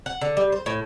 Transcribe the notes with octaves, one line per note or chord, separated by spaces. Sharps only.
F#5
D3
G3
C5
A2